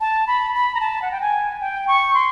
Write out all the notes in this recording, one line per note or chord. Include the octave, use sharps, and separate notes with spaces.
A5
B5
B5
A#5
A5
F#5
G5
G#5
G5
C#6
C6